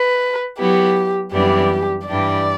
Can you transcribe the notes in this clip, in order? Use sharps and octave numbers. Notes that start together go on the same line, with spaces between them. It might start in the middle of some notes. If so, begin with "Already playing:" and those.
Already playing: B4
F#3 B3 E4 G4
F#2 E3 G3 B3 D4 G4
G2 E3 G3 D4 G4 D5